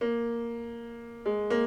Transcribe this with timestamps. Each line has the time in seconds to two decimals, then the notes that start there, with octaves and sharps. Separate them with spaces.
0.01 A#3
1.25 G#3
1.50 A#3